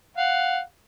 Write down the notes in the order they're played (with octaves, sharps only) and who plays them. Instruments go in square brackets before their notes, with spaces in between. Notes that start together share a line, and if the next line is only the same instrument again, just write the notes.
[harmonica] F5 F#5